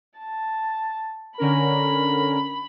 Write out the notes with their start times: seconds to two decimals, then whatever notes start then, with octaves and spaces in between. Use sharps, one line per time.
0.18 A5
1.38 D3 C#4 A#4 B5